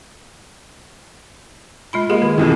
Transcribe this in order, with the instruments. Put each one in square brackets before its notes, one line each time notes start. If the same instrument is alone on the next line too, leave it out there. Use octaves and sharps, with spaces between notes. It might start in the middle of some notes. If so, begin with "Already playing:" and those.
[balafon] G#3 F4 B5
[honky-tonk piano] G#3 [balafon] A#3 G4 A#4
[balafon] D#3
[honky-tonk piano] B1 F2 E3